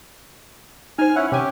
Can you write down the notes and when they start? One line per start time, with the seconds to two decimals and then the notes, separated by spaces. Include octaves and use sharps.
0.98 D#4 C5 G#5 F6
1.16 C#4 E4 F#5
1.32 C3 C#4 G4 G#5